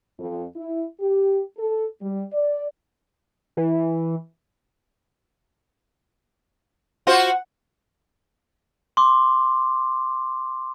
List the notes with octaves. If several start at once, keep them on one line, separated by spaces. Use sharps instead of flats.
F2
E4
G4
A4
G3
D5
E3
F4 F#4 C5 F#5
C6 D6